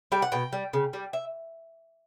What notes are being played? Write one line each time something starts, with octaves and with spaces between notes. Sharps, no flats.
G3 G5
F#5
B2 G5
G3
C#3
G3
E5